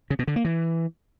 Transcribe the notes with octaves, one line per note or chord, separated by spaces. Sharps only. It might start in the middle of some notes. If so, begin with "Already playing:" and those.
C#3
B2
D3
A#3
E3